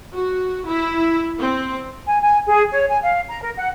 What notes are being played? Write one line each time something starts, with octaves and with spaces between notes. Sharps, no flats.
F#4
E4
C4
G#5
G#5
G#4
C#5
G#5
F5
A#5
A#4
F#5